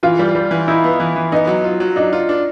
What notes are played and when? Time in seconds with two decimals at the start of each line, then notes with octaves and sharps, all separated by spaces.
0.03 E3 F4
0.19 G3
0.35 G3
0.51 E3
0.68 D#4 E4
0.84 B3
1.00 E3
1.16 E3
1.32 B3 D#4
1.47 F#3
1.64 F4
1.80 F#3
1.96 D4 D#4
2.13 F4
2.29 D4